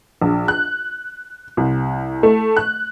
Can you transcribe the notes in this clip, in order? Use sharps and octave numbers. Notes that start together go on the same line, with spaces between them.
A#1
F#6
C2
A3
F#6